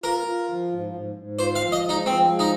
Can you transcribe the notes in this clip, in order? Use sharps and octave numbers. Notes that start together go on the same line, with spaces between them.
F4 A#4
F4
F3
G#2
G#2
G#2
F4 C5
F5
F3
D#5
G#3
D#4
F3 C4
G#3
D#4